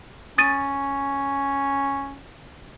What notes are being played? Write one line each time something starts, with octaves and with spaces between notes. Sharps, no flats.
C#4 D#6 A6 D#7